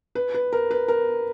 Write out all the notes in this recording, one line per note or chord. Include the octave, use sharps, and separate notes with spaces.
B4
B4
A#4
B4
A#4